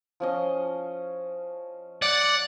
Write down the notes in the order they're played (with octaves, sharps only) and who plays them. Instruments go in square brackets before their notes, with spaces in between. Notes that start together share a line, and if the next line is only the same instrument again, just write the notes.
[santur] F3 C#4 D#5
[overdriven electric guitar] D5 [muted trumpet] F#5